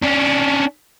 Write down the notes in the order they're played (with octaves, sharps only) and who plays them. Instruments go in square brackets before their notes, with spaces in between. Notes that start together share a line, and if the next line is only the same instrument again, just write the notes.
[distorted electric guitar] C#4 D4